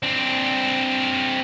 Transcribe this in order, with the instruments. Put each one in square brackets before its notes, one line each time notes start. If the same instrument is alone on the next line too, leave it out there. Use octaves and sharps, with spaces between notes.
[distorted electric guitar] C4 D4